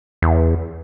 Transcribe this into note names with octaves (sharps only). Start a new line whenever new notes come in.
E2